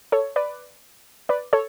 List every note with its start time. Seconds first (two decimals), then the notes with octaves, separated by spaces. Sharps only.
0.12 A4 C#5
0.36 B4 D5
1.29 B4 D5
1.53 A4 C#5